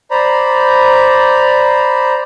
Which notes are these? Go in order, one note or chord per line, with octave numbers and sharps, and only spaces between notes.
C5 D5 A#5 B5